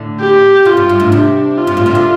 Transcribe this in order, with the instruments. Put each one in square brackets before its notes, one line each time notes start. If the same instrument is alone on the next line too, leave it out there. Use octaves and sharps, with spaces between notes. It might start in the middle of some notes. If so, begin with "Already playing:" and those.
Already playing: [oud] A2 D3
[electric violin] G4
[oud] C3 [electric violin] F4
[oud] G2
G2
A2
[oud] C3 [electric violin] D4
[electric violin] F4
[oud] G2
A2
C3
D3